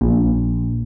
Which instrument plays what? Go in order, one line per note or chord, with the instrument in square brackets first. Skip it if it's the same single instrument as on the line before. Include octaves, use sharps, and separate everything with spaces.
[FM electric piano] A#1